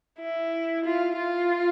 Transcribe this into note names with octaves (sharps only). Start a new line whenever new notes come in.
E4
F4
F4